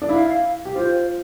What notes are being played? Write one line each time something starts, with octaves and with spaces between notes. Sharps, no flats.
D4
E4 F5
G4
F4 C5